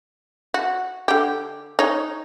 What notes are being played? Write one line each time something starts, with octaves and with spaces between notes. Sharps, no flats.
F#4
D3 G4
D#4 C#5